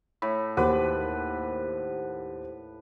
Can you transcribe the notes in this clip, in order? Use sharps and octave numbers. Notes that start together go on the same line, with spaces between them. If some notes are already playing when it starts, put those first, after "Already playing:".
A2 B5
D#2 G4 B4 C5 F#5 D6